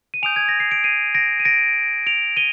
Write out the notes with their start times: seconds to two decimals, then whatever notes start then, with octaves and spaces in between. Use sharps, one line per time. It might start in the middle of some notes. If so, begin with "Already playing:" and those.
0.14 D#7
0.23 G#5 D#6 G6 D7 F7
0.36 G#6
0.49 A#6
0.60 C7
0.72 D7
0.84 C7 D#7
1.15 A#6 D7
1.40 D#7
1.45 A#6 D7
2.07 D7 F7
2.37 D#7 G7